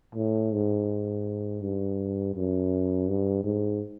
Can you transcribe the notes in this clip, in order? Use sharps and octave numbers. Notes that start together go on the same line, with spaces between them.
A2
G#2
G2
F#2
G2
G#2